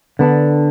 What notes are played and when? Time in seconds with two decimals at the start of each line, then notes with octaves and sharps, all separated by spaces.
0.19 D3 B3 D4 A4